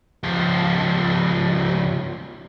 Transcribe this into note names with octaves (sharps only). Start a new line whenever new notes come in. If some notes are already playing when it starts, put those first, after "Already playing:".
C#2 F3